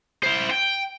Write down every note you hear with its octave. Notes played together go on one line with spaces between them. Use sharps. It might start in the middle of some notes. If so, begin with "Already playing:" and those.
E4 C5
G5